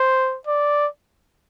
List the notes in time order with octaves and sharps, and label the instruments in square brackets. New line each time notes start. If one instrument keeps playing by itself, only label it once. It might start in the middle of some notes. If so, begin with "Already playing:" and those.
Already playing: [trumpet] C5
D5